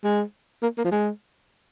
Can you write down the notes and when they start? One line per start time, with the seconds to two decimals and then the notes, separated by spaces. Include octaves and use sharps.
0.04 G#3
0.63 A#3
0.78 A#3
0.85 F3
0.92 G#3